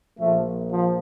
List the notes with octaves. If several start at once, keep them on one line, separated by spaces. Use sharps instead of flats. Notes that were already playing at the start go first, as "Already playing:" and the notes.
A#1 A#2 F3 A3
F3